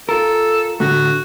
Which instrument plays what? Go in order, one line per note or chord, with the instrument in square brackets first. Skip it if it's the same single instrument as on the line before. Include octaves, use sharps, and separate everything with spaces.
[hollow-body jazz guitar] F4 A#4 [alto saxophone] A4
[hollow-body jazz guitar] A2 D3 A3 [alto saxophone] F#4